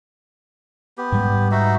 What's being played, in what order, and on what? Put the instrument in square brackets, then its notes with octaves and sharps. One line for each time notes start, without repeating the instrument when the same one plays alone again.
[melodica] B3 G4
[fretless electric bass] G#2 G3
[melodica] D#4 F#4 E5